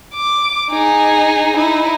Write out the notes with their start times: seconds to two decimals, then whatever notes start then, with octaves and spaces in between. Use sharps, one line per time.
0.15 D6
0.71 D#4 G#4
1.57 D#4 E4